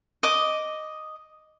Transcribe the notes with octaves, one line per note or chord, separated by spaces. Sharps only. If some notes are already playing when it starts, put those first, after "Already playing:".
D#5 D6